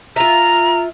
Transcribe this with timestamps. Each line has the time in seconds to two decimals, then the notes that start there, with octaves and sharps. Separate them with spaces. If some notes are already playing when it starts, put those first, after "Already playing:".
0.16 F4 E5 A#5